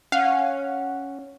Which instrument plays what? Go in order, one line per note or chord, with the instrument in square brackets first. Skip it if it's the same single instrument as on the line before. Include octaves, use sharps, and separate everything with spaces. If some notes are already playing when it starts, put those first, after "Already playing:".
[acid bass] C#4 [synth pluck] F5 [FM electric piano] F#5